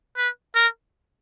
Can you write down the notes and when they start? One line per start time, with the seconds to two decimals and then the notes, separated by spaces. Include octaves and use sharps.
0.17 B4
0.55 A#4